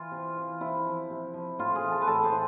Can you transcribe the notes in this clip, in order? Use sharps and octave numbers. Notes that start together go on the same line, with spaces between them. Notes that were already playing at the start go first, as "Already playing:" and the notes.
Already playing: E3 F4
C3
E3
C3 E4
F3
C3
F3
A2 F4
G#4
E3
A4
B4
A2 A4
C5
E3